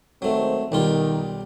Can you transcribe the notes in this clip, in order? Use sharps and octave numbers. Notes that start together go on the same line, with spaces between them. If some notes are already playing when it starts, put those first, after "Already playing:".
G#1 F#3 A3 C4
B1 D#3 G3 F4